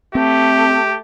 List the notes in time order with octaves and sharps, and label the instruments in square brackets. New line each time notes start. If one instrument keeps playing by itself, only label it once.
[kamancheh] A3 [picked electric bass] C4 [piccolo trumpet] G4